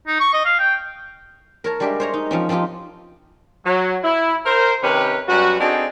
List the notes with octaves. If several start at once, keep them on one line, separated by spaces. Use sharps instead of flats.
D#4
C#6
D#5
F5
G5
A#4 C#5 A5
G3 G#3 D4 G4 D5 E5
C5 C#5 A#5
D#4
F3 C4 C#4
F3 C4 D#4 F4 G4
F#3
E4
A#4 C5
C3 D#3 C#4 G4 B4
F#2 G3 B3 F#4
C4 D4 D#4 F#4 G#4 A4